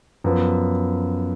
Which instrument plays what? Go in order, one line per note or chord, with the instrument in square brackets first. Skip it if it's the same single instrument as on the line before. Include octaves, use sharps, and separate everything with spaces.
[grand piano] F#2 F3 B3